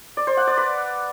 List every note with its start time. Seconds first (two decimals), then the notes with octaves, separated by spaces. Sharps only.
0.17 D5
0.27 C5
0.37 F#5
0.47 D5
0.57 B4